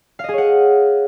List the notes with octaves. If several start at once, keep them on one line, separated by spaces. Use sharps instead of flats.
G#4 C#5 D#5 F5 F#5